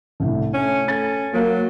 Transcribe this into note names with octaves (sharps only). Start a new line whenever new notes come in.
C2 A2 D3
A3 C#4
C#4 A4 A6
F#3 A#3